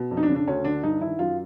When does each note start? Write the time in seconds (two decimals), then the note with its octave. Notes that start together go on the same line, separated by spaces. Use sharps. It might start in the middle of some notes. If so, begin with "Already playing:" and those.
Already playing: B2
0.11 F2
0.17 D#4
0.23 D4
0.29 C#3
0.35 D4
0.47 D2 C#4
0.65 D3 D4
0.83 G2 D#4
1.01 D#3 E4
1.19 F#2 F4